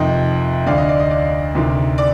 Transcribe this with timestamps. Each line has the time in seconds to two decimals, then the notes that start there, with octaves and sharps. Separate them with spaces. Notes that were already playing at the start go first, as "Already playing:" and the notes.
Already playing: F2 C3 D#3 D#5 G5
0.66 D2 D3 D5 F5
0.78 D#5
0.89 D5
1.00 D#5
1.11 D5
1.55 D2 C3 D#3
1.98 D5